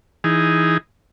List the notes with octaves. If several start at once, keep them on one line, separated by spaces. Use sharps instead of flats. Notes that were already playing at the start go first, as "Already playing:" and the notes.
E3 D#4 G#4